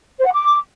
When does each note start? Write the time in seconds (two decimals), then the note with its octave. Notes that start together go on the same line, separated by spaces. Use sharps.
0.19 C5
0.25 F#5
0.32 D6